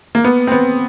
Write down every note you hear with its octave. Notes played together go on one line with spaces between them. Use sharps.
A#3
B3
C4
B3